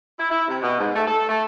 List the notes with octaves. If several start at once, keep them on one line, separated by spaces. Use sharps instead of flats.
E4
E4
C3
B2
G#2
A3
A4
A3